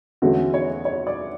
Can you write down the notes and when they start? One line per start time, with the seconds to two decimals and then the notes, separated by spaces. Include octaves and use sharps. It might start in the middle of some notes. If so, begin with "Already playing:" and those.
0.22 E2 D3 A3 C#4 F#4
0.54 C#5
0.85 C#5
1.07 D5